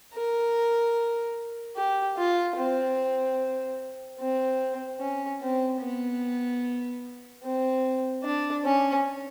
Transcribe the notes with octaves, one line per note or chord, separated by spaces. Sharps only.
A#4
G4
F4
C4
C4
C#4
C4
B3
C4
D4
C#4